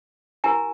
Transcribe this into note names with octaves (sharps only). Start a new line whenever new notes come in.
E4 G4 A#4 G#5 A#5